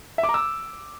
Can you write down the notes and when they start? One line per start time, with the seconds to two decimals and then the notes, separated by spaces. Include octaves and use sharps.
0.18 E5
0.23 D6
0.29 A#5
0.34 E6